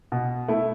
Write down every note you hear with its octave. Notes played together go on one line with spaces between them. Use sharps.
B2
A3 E4